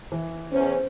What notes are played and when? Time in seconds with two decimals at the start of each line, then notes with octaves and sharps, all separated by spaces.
0.12 E3
0.52 E2 C#4 C5